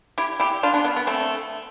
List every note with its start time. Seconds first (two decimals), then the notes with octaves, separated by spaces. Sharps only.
0.18 E4 G4
0.40 E4 G4
0.63 D4 F4
0.73 B3 D4
0.84 B3
0.96 B3
1.07 A3 C4